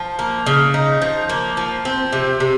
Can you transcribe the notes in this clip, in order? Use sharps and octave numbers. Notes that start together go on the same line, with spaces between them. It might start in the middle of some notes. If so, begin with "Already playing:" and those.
Already playing: F3
A#3
C#3
D#4
F3
A#3
F3
C4
C3
C3